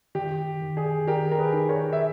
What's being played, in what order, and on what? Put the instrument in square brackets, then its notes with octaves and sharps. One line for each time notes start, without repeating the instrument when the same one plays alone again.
[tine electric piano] D#3 [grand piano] G4
[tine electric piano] D#3
[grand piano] G#4
[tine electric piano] D#3 [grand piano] G4 A#4
[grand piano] A#4
G#4 B4
[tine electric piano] D#4
[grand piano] A#4 C#5
E5